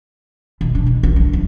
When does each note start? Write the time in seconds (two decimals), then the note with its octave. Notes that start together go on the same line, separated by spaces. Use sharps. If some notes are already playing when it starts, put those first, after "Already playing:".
0.61 B2
0.75 D4
0.86 C#2
1.03 A#1
1.16 D4
1.33 D1